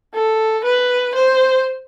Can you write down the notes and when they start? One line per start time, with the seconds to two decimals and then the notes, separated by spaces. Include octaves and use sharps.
0.14 A4
0.65 B4
1.15 C5